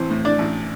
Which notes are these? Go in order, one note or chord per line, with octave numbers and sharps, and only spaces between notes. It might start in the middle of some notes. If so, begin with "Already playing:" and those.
Already playing: A1 E3 C4 C5
A2
D4 D5
A1